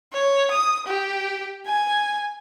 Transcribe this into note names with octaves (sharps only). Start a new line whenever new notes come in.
C#5
D#6
G4
G#5